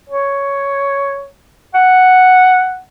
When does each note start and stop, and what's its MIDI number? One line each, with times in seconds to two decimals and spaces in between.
0.10 1.27 73
1.74 2.80 78